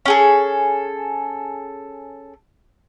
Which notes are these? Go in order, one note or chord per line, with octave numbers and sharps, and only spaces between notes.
C#4 G#4 A4